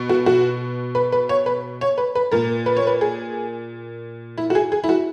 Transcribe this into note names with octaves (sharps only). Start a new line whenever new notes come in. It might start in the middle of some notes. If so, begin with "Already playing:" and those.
Already playing: B2
F#4
F#4
B4
B4
C#5
B4
C#5
B4
B4
A#2 A#4
B4
C#5
B4
G#4
E4
F#4
G#4
G#4
E4
F#4